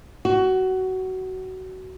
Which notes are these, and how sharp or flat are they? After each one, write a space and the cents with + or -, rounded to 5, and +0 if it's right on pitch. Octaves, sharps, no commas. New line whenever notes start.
F#4 +20